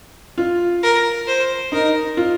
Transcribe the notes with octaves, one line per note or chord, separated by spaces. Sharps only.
F4
A#4
C5
D#4 A#4
F4